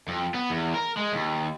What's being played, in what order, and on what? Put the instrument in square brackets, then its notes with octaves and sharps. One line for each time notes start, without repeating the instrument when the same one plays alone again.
[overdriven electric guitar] F2
B3
E2
A#4
G#3
D#2